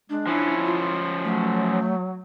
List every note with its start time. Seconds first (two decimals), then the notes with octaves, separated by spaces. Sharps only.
0.10 G#3 D4
0.27 F3 C#4 E4
0.66 F4
1.24 F#3 A3